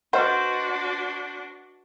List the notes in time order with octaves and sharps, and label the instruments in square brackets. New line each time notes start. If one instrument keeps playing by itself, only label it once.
[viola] D4 F#4 [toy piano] B4 D#5 F#5 [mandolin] C5